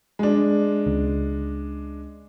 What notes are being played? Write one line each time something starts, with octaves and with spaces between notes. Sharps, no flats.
G#3 D4
C#2 C#3